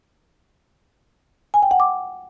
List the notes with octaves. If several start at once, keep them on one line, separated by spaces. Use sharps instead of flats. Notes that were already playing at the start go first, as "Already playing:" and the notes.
G#5
G5
F#5
D6